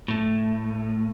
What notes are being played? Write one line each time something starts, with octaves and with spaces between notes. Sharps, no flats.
A2 A3